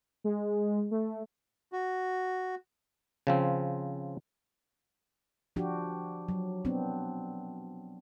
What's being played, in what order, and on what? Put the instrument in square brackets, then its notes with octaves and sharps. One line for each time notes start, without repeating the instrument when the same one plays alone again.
[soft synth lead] G#3
A3
[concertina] F#4
[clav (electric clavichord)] C#3 F3 C4
[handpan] F3 D4 F#4 G4
F#3
B3 C4 D4